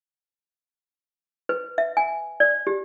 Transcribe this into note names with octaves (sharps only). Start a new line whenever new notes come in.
B4
E5
G#5
D5
G4